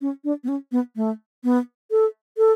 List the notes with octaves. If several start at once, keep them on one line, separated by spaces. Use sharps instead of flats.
C#4
D4
B3
C#4
B3
A3
B3
A4
A4